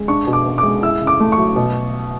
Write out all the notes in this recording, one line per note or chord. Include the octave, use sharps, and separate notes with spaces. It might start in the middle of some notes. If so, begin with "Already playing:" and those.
Already playing: G#3
D4 C#6
B2
D6
B3
D6
G#3
E4 E6
C#3
D6
A3
C#6
F#3
B2